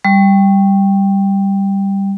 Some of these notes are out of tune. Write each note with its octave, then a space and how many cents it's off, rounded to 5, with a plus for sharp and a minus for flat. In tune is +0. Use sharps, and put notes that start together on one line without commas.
G3 +5